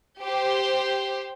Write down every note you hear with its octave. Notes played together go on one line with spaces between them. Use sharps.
G4 C5